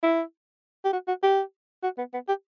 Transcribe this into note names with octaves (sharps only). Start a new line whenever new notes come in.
E4
G4
F#4
F#4
G4
F#4
B3
B3
G4